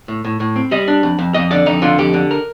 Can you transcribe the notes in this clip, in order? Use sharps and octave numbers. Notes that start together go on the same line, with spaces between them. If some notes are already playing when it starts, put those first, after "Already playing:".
A2
A2
A2
C4
G3 D#5
D4
F2
F2
F2 D#5
D3 D5
F2 D#4
D3 F4
F2 G4
D3
A#4